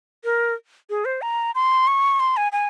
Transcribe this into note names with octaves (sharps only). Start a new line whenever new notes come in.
A#4
G#4
C5
A#5
C6
C#6
C6
G#5
G#5